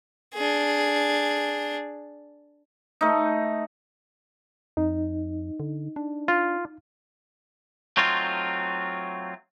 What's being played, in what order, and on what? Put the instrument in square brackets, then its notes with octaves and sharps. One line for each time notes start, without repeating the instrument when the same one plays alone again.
[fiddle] D4 G#4
[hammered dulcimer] A3 D#4
[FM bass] F2 [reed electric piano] D#4
[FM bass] D3
D4
[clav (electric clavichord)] F4
[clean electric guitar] F#3 A3 C4 D#4 F4